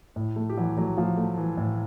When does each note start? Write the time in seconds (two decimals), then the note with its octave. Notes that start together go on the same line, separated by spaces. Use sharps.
0.16 A2
0.36 A3
0.50 G4
0.57 E3 F#3 F#4
0.77 F#3 A3 F#4
0.97 F3 A3 F4
1.17 A3
1.38 E3
1.57 A2